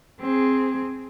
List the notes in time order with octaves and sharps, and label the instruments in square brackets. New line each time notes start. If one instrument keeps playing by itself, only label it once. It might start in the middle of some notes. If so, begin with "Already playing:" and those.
[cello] C4 G#4